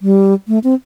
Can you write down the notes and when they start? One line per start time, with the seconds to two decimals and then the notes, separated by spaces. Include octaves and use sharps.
0.02 G3
0.48 A3
0.64 C4